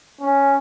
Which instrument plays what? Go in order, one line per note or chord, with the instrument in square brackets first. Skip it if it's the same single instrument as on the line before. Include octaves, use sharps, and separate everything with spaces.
[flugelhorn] C#4